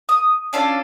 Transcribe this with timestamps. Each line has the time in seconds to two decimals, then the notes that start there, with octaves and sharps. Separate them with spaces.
0.09 D#6
0.53 C#4 D4 F4 A4